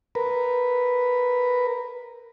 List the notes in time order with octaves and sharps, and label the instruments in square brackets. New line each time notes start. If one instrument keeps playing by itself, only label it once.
[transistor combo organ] A#4 B4